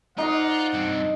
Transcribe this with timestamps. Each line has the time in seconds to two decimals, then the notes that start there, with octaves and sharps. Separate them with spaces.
0.18 D#4 F4 C5 D5 D#5 F#5
0.74 G2 C4